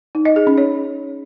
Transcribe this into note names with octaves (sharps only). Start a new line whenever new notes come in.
D#4
D#5
G#4
C#4
C#5